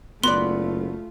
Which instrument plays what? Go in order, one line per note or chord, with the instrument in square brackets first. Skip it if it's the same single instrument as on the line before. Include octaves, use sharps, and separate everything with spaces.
[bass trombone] F#1 [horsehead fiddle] A3 F4 [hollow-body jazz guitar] B3 F#4 D5 [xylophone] C6